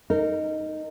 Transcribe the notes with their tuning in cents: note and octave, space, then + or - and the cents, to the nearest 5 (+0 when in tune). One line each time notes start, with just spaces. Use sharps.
D#4 +0 A#4 -20